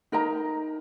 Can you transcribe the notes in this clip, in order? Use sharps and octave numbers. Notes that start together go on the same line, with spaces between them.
D#4 A#4 D#5 A#5